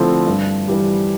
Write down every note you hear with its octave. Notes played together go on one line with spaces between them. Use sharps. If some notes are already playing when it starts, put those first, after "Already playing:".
Already playing: D3 F3 A3 C4 E4
G2
E3 G3